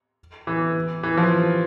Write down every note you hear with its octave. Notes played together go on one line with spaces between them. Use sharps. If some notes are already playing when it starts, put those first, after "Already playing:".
E3
E3
F3